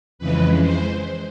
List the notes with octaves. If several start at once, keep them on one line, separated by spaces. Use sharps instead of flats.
F2 C#3 E3 G#3 B4
C5